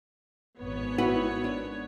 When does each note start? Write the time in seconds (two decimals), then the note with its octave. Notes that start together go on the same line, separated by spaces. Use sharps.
0.59 G#1 B3 C#5
0.98 E4 F#4 B4
1.44 D4